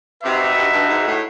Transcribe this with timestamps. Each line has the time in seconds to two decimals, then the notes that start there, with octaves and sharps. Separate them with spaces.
0.23 C3 D#4 F#4 B4 E5
0.56 G2
0.72 G2
0.88 G#2
1.05 A2